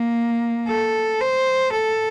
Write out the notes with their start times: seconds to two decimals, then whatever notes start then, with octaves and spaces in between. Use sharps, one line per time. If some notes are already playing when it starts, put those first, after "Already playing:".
Already playing: A#3
0.68 A4
1.20 C5
1.72 A4